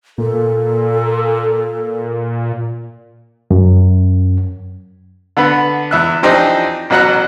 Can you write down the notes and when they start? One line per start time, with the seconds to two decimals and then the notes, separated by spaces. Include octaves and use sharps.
0.18 A#2 A4
3.51 F#2
5.37 D3 B3 B4
5.91 E2 E5 F#6
6.23 E3 F3 C4 D4 D#4 G4
6.90 A1 B2 F#3 F#5 A#5 F#6